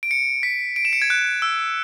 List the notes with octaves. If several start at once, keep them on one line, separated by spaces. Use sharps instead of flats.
D7
C#7
B6
D7
E7
C#7
G#6
F#6
E6